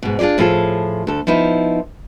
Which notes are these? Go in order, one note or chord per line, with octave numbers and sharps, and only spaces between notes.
G#2 B2
D4 F4 G4 G#4 D5
A2 F3 F4 G#4 A4
D2 A4
F3 B3 D#4 E4